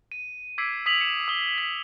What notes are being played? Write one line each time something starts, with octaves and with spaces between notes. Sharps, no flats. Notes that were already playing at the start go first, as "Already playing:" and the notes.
D#7
D6 E6 G#6 B6 C7 D7
D#6 B6 F7 F#7
C#7 E7 F#7
D#6 G7
B6